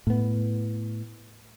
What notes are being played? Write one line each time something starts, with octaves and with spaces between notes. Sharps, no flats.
A2 B3